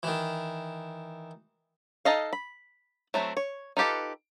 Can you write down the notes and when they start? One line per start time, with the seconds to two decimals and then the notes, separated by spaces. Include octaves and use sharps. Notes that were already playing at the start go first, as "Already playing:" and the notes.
0.03 D#3 E3
2.05 D#4 A4 D#5 F5
2.33 B5
3.14 F#3 A3 C4 E4
3.37 C#5
3.77 D#4 F4 G4 A4 B4